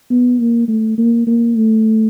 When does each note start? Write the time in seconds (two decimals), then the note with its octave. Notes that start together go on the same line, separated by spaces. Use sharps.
0.10 B3
0.39 A#3
0.68 A3
0.97 A#3
1.26 A#3
1.55 A3